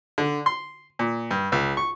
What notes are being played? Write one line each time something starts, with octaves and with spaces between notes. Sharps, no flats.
D3
C6
A#2
G2
C#2
C#6